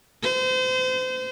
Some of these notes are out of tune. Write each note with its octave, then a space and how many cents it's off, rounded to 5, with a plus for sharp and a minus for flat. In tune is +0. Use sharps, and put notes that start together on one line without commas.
C5 -35